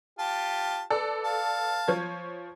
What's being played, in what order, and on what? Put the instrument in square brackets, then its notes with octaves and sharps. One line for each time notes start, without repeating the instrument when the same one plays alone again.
[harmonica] F4 G4 A5
[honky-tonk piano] A4 B4 D5
[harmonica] F5 A5
[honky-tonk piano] F3 C#5 G#6